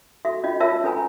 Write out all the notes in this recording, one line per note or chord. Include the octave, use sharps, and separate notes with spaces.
F#4 A4 E5
C#4 F4 D#5
F4 A#4 C#5 E5 A5 E6
C#4 A4 B4 G#5 A#5